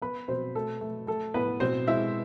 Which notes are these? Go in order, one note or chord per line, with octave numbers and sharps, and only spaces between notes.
B3 B4 B5
B2 C4 C5
A3 A4
A3
A3 A4
A2 B3 B4
B2 C4 C5
G#3 E4 E5